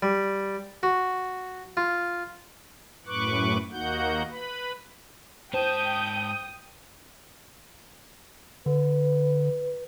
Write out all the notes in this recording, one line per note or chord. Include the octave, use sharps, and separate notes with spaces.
G3
F#4
F4
F#2 A2 B4 C#6 D6 F#6
D#2 A#3 D#4 F#4 F#5 G6
B4 B5
G#2 C5 G5 A5 D#6 G6
D3 B4